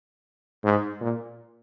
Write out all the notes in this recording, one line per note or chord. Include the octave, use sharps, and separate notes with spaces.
G#2
A#2